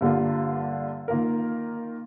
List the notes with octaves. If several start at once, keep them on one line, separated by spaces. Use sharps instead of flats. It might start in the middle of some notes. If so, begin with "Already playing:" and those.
G2 D3 G3 A#3 F4
D#3 A#3 F4 A#4